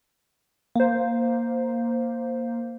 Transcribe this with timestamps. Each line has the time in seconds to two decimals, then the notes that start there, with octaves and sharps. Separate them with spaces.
0.76 A#3 C5